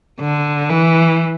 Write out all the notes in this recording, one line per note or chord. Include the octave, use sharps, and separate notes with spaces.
D3
E3